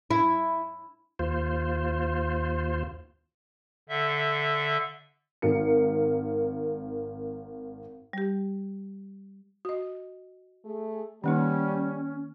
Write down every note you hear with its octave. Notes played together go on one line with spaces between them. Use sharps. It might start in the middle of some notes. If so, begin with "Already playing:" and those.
E4
D#2 F4 C5
D3 E5
G#1 A#4 C#7
G3 G4
F#4 D#5
A3 G#4
D#3 G3 A#3 C#4 D#4